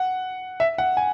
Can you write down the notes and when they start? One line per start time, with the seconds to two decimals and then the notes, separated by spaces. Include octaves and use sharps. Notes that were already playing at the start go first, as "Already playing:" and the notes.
Already playing: F#5
0.60 E5
0.78 F#5
0.97 G#5